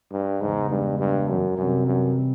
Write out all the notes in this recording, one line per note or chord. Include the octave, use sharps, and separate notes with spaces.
G2
E2 G#2 C#3 E3 G#3
G2
G2
F#2
F#2 C3 E3 G3 C4
F#2